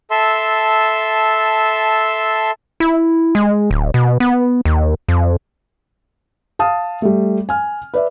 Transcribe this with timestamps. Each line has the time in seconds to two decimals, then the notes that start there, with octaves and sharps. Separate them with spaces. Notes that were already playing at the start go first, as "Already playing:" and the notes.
0.11 A4 E5 A5 C6
2.80 E4
3.35 G#3
3.71 D1
3.94 B2
4.20 B3
4.65 D#2
5.09 F2
6.59 F5 A5 D#6
7.02 G3 A3
7.49 G#5 F6
7.94 B4 D5 E5